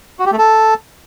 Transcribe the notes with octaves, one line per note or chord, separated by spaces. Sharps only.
F#4
G4
A3
A4